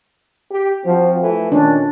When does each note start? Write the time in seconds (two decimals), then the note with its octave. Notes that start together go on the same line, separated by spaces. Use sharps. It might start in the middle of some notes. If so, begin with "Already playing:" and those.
0.51 G4
0.85 F3 C4 F#4
1.21 E3 F3 A3
1.52 A#2 D#3 C#4 D4